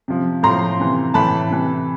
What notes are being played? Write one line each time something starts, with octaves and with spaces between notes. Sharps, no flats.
C3 F3
A2 F3 A#5 C6
C3 E3
A2 E3 A5 B5
C3 E3